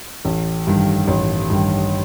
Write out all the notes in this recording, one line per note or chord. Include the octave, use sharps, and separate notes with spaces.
A1
G2 D#3
A1
G2 D#3